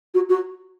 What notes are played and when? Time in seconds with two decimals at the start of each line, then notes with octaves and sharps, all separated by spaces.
0.14 F#4
0.29 F#4